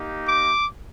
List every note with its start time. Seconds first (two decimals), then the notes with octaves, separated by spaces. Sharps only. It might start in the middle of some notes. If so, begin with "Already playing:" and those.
Already playing: A#3 D#4 G4
0.25 D6